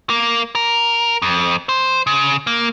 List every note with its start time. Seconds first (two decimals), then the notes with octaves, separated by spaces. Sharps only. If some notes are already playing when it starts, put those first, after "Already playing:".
0.10 A#3
0.55 A#4
1.22 F2
1.69 C5
2.07 C#3
2.47 A#3